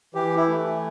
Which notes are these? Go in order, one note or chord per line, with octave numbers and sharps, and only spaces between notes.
E3 G4
E4
A3